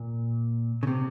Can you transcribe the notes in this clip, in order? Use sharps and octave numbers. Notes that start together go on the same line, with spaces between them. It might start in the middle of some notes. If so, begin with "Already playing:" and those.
Already playing: A#2
C#3
C3